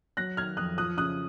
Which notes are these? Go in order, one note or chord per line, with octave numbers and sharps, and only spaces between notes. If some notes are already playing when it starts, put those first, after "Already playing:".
F#3 F#6 A#6
D#3 F6 G#6
F2 D#6 F#6
F3 D#6 F#6
C#3 D#6 F#6